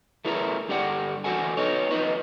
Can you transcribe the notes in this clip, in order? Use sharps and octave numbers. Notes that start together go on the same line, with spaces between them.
A3 B3 E4 G#4 A#4
G2 D3 G4 D5 F#5
E2 D3 F#4 A4 F#5 G#5
B3 D#4 C#5
D#4 F4 B4 D#5